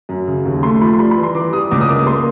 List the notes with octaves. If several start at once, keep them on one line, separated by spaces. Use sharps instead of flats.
F#2
C#3
D#2
A3 C6
F3 B5
C6
G3 B5
B5
E3
C6
E3 D6
G3 D#6
C#2 D6
D#6
A#3 D6
A#3 C6